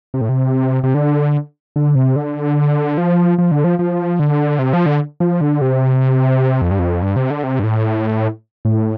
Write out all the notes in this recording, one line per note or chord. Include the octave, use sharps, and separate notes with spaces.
C3
A2
C3
C3
D3
D3
C3
D3
F3
F3
D3
F3
F3
D3
C3
F3
D3
F3
D3
C3
F2
G2
F2
G2
C3
D3
C3
G2
A2
A2